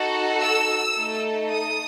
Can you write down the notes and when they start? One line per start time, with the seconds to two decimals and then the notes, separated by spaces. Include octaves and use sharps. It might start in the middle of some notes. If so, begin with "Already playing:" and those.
Already playing: D#4 F#4 A4
0.40 E6
0.96 A3 D#4 A4
1.51 D#6